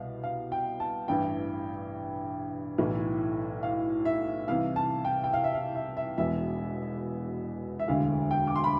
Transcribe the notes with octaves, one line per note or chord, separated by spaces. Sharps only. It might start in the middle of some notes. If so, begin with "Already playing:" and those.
Already playing: C2 B2 F5
F5
G5
A5
A1 G2 E3 G5
B1 A2 E3
F5
E5
C2 C3 E3 F5
A5
G5
G5
F5
E5
F5
E5
E5
E1 E2 B2 E5
E5
E1 D2 D3 F5
G5
D6
C6
B5